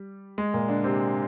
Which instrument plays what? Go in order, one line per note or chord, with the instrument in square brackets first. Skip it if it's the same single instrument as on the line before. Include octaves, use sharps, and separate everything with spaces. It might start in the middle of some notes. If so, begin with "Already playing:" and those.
Already playing: [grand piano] G3
G#3
A#2 A#3
D3 D4
C3 C4